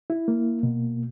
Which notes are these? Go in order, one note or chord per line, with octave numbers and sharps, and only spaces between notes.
E4
A#3
B2